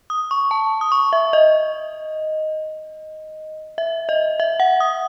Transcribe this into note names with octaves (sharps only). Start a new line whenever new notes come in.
D#6
C#6
A5
D#6
C#6
E5
D#5
E5
D#5
E5
F#5
D#6